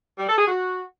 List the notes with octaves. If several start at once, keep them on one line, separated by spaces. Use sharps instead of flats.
G3
A4
G#4
F#4